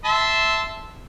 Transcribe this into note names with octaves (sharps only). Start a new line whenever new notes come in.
E5 A5 C6